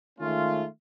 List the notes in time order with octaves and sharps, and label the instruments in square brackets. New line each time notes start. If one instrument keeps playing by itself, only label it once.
[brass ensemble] D#3 G#3 A3 C#4 F4